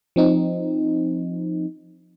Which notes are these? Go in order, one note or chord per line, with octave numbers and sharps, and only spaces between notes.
F3 C4 D#4